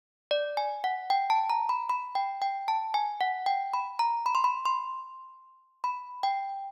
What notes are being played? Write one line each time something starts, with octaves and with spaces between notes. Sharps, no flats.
D5
G#5
F#5
G5
A5
A#5
B5
B5
G5
G5
A5
G#5
F#5
G5
B5
A#5
B5
C6
B5
C6
B5
G5